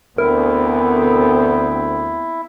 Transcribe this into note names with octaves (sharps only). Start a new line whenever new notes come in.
D2 B3 C4 E4 A#4